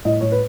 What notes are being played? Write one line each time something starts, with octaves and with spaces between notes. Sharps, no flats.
A2 D#5
A2 C#5
B4